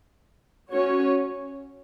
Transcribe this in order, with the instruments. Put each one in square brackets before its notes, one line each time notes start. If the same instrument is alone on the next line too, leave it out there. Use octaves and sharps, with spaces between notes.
[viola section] C#4 F#4 C#5